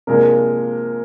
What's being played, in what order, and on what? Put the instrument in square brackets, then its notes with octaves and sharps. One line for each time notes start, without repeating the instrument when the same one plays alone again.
[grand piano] C3 F3 G#3 D4 [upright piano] A#3 A#4